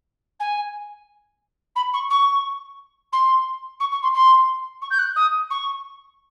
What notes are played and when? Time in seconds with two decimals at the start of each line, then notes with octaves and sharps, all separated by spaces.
0.39 G#5
1.75 B5
1.93 C#6
2.10 C#6
3.12 C6
3.80 C#6
3.91 C#6
4.02 C6
4.14 C6
4.81 C#6
4.90 G6
4.98 F#6
5.16 D#6
5.50 C#6